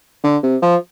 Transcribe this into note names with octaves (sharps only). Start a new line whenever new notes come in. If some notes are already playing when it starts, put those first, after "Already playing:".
D3
C3
F3